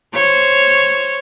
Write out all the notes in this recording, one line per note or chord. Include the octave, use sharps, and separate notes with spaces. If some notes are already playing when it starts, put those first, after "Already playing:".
C5 C#5